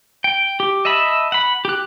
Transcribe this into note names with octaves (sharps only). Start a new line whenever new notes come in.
G5
G4
D#5 E5 A5 B5
F#5 B5
G4 F#6